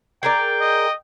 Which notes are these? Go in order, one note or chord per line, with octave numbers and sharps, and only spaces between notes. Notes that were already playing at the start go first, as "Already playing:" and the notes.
G#4 A#4 D5 G5
D#5